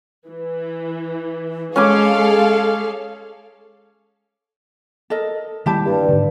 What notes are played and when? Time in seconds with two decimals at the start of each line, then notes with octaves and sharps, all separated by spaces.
0.28 E3
1.76 G#3 C#4 G#4 A4 F5 G#5 D6
5.10 A4 A#4 D#5
5.66 D#3 G3 A#3 E4 G4 A5
5.85 G2
6.09 G#2 D3